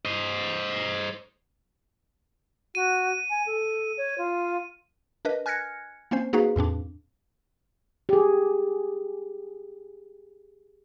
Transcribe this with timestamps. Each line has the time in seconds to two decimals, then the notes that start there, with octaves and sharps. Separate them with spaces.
0.05 C5 D#5
2.75 F#4 D#7
3.30 G#5
3.46 A4
3.97 C#5
4.18 F4
5.25 D4 A#4 B4 D#5
5.46 G#5 F6 F#6 G#6 A#6 C#7
6.11 A#3 C4 C#4 C5
6.33 A#3 D#4 F#4 G#4 B4 F5
6.56 E2 A2 C4 D4
8.09 G4 G#4